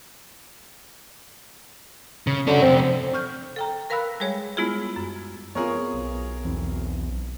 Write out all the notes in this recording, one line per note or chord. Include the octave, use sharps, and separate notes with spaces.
C#3
D3 C#4 F#4
F2 C3 C4
C#6 F6 G6
A4 G5 A#5
A#4 B4 F5 B5 E6 F#6
G3 G#3 G#4 C#5
G#3 B3 E4 F4 G#4
F#2
B3 C4 F4 G#4 A#4 C#5
B1
E2 C4 E4